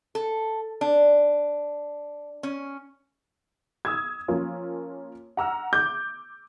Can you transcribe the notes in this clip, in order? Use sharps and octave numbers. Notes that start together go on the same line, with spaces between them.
A4
D4
C#4
D#6 E6 G#6
F3 A#3 C#4 F4
F#5 A#5 E6 F6
D6 G6